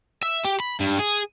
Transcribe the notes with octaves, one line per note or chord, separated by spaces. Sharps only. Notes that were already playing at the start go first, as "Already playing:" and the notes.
E5
G4
B5
G2
G#4